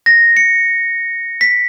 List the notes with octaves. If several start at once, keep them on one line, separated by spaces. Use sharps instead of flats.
A#6
C#7
B6